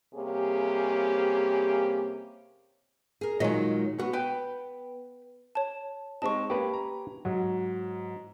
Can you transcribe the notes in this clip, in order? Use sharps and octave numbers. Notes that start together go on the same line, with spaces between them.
C3 G3 A#3 C#4 G4 G#4
G#4 A#4
A#2 D#3 F#3 G#3 D#5
B3 F#4
B4 G5
C#5 A5
G#3 C4 D#4 A5 C#6
A#3 C#4 G4 B4 C#5
A#5
G#2 F#3